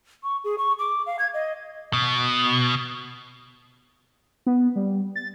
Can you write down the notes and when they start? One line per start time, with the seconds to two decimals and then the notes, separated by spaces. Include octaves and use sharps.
0.23 C#6
0.44 G#4
0.58 C#6
0.79 D6
1.06 F5
1.19 G#6
1.34 D#5
1.93 B2
4.46 B3
4.76 G3
5.16 A6